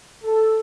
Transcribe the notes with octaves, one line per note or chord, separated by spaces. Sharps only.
A4